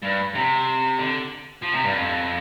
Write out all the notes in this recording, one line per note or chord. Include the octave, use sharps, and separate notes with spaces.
G2
C3
D3
F3
C3
G2
F2